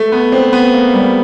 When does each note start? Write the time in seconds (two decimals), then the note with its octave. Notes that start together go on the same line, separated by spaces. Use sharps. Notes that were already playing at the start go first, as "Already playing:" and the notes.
Already playing: A3
0.12 B3
0.32 C4
0.53 B3
0.73 A#3
0.94 G3